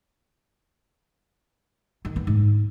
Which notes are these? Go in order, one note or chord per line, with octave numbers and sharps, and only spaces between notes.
D#3
B3
G#2